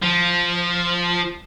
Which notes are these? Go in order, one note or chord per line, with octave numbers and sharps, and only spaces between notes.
F3